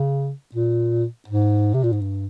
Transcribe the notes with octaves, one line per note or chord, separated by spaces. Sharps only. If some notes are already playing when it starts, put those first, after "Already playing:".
Already playing: C#3
A#2
G#2
C3
A#2
G#2
G2